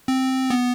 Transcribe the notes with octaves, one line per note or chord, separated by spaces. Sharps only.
C4
B3